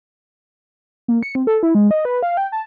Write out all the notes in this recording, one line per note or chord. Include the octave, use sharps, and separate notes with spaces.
A#3
C#7
C4
A4
E4
G#3
D#5
B4
F5
G5
A5